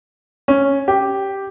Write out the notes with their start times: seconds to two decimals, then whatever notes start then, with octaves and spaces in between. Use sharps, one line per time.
0.48 C#4
0.88 G4